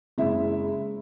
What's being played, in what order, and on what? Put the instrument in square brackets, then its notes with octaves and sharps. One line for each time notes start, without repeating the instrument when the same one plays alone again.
[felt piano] F#1 G#3 E4 E5